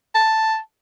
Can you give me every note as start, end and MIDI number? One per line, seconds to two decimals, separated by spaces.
0.15 0.58 81